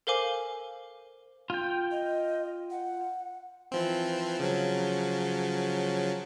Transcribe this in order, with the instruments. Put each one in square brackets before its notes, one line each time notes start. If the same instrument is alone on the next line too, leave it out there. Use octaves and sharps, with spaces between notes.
[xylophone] A4 A#4 C5 F5 G#5 D6
[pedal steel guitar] F4 G5
[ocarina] D#5
F#5
[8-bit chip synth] E3 F3 C4
C#3 F3 F#3